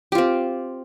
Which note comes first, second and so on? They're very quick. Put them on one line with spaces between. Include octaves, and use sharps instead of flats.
G4 F4 C4